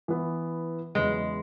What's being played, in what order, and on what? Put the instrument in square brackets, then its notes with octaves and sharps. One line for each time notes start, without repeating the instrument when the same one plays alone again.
[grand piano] E3 B3 E4
[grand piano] E2 C#3 F#3 B3 [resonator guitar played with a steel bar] G#3